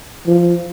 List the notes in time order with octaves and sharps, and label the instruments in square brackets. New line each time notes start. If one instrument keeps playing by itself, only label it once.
[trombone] F3